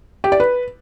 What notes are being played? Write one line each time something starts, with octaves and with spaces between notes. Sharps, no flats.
G4
D5
B4